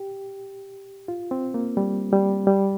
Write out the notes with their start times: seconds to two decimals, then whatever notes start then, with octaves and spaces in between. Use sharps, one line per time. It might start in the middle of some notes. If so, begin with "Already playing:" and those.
Already playing: G4
1.08 F4
1.31 C4
1.54 A#3
1.77 G3
2.12 G3
2.47 G3